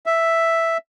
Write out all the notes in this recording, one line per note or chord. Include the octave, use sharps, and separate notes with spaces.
E5